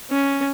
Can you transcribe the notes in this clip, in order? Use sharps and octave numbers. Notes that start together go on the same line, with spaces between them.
C#4